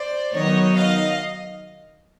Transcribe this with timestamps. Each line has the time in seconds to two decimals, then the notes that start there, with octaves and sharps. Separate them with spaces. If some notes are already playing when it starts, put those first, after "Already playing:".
Already playing: C5 D5
0.34 D#3 F#3 B3 D#4 C#5 D#5
0.75 D#5 F5